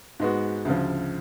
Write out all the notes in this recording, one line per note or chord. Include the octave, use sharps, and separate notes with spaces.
G#2 G#3 B3 F#4
D2 C#3 F3